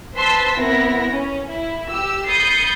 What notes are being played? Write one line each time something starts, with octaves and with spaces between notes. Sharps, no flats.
B4 C5 A5 C6 E6 B6
B3 C4 E4 A#4 A#6
C#4
E4
G4 E6
B5 D#6 G6 A6 C7 C#7